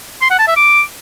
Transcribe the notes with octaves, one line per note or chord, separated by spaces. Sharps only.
C6
F#5
A5
E5
D6